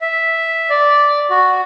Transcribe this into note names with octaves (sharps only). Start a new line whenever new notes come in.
E5
D5
F#4